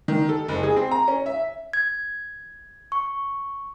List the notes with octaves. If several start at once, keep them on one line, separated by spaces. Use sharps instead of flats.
D#3
A4
F#1
G#4
C4
A#5
C#4
E5
G#6
C#6